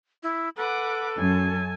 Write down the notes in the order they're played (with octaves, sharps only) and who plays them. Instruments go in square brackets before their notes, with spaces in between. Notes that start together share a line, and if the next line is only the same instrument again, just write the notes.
[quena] E4
[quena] A4 [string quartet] B4 F#5 D6
[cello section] F#2 [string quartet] G#5 A5